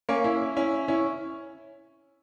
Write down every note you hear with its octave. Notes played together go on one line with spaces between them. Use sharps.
A#3 C#4
C#4 E4
C#4 E4
C#4 E4